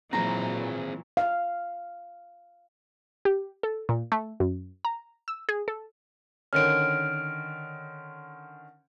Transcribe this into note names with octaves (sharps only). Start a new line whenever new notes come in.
A#2 E3 F#3 C4 G#4 C5 A#5
F5
G4
A4
A#2
A3
F#2
A#5
E6
G#4
A4
D3 D#3 C#4 F6 D7